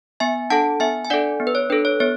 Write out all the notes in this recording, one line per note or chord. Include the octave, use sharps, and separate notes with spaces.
B3 E5 G#5
D4 A4 F#5 A5
B3 E5 G#5
G#5
D4 A4 D5 F#5
B3
B4
C#5
D4 A4 B4
C#5
B3 C#5